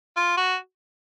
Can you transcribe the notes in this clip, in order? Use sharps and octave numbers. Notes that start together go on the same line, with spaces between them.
F4
F#4